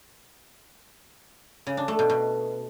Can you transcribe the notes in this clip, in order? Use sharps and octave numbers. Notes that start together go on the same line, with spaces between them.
C#3
D4
A3
B2
B2